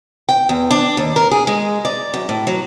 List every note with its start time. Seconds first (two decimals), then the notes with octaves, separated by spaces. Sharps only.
0.29 G5
0.49 E2
0.71 D4
0.97 D#2
1.16 A#4
1.31 G#4
1.47 G#3
1.85 D5
2.14 F#2
2.29 A2
2.47 F#3